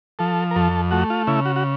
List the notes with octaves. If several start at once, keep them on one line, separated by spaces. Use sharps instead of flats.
F3 A4
A#4
F2 A4
A3 F#4
F4
C#3 E4
F#4
F#4